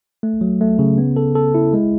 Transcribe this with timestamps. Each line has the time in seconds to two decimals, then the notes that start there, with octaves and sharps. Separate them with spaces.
0.23 A3
0.41 F#3
0.61 A3
0.79 C#3
0.98 B3
1.16 A4
1.35 A4
1.55 E4
1.73 G#3